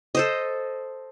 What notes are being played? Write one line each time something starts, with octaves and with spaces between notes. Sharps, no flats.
A4 C5 D#5